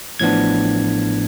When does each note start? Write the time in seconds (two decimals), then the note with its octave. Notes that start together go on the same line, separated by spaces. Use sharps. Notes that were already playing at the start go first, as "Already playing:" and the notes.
0.20 A1 A2 F3 B3 D4 G#6